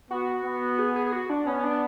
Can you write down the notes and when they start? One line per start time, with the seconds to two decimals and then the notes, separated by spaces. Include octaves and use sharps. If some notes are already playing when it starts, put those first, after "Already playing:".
0.10 B3 F#4
0.44 B3
0.79 G#4
0.95 G#4
1.06 G#4
1.12 F#4
1.30 D4
1.46 B3 C#4
1.63 D4